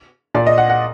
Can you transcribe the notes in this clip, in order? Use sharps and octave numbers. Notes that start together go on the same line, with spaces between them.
A#2 D5
D#5
F#5
F#5